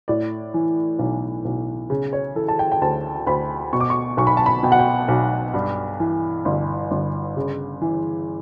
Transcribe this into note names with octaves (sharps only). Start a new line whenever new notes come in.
A2 D5
E3
B1
B1
C#3
C#5
E3 A4
A5
G5
G5
D2 A5
D2 B5
B2 C#6
D6
C#6
B1 C#6
B5
A5
B5
B2 G5
F#5
G5
B1
G2
E3
G1
G1
C#3
E3